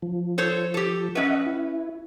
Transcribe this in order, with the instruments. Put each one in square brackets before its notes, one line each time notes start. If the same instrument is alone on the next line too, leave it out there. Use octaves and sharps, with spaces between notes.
[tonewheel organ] F3
[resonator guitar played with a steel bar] A4 C5 C#5
G4 A4
[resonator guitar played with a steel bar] C#4 B4 [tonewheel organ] D#5 E5 F#5
[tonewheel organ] E4